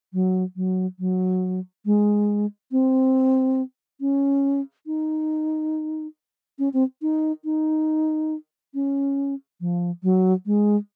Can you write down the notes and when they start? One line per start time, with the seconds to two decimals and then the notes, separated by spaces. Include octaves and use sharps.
0.13 F#3
0.56 F#3
0.99 F#3
1.85 G#3
2.72 C4
4.00 C#4
4.86 D#4
6.59 C#4
6.73 C4
7.02 D#4
7.44 D#4
8.74 C#4
9.61 F3
10.03 F#3
10.46 G#3